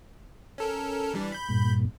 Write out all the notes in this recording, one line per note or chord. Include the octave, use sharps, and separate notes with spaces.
C#4 A4 A#4
E3 G3 D4
B5 G6
G2 A#2